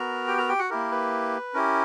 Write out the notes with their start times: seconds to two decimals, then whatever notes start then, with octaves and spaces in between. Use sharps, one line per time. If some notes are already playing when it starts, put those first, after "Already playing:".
Already playing: B3 F#4 A#4 A#5
0.28 G4 G5
0.38 A#4 A#5
0.49 G4 G5
0.59 F#4 F#5
0.70 A#3 E4 G4 A#4
0.91 B4
1.54 C#4 E4 G4 A#4